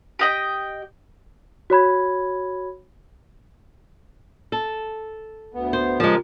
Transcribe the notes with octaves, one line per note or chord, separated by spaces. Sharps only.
G4 D#5 G5
F#4 C#5 B5 G#6
A4
D2 B3
C5
C#3 F3 G#3 G4 A#4